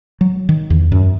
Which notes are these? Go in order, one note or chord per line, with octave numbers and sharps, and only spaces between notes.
F#3
D#3
E2
F#2